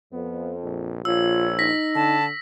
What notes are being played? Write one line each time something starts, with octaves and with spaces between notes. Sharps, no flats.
F2 B3
A#1
A#1 F4 C#5 E6
D#4 A#6 B6
D3 A5